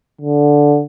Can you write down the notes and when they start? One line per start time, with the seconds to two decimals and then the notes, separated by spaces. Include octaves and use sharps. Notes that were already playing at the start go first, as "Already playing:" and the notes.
0.21 D3